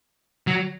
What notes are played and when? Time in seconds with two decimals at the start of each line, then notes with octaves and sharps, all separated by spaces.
0.47 F#3